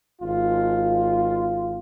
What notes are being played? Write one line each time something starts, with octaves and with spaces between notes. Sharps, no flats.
G#1 F4